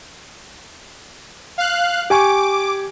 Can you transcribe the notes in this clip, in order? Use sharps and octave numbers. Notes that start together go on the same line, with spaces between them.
F5 F#6
G4 G#5 C#6 D6